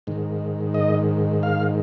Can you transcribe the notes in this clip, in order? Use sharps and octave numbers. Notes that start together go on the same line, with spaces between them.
G#2 D#3
D#5
F5